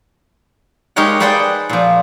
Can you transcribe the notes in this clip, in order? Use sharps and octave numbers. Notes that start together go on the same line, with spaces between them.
G#3 D#4 G4 A#4 C#5 F#5
G#4 B4 C5 D5 F#5 G5
A#2 F3